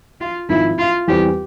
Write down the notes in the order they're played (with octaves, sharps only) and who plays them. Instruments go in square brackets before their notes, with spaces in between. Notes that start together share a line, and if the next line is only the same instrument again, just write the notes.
[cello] F4
[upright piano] G#1 G#2 F3 [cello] E4
[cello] F4
[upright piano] E2 E3 G3 C4 [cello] G4